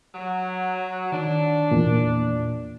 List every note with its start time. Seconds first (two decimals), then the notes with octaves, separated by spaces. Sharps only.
0.14 F#3
1.12 D#3 D4
1.71 E2 A#2